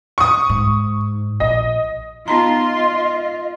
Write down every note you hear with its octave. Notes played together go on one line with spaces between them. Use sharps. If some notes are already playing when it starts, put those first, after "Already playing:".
C#6 D#6
G#2
A#1 D#5
B3 D#4 F4 D#5 A#5 C6